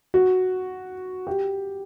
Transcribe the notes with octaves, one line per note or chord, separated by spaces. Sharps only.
F#4
G4